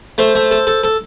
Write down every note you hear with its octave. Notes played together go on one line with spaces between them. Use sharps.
A3 C5
A3
A4
A4
A4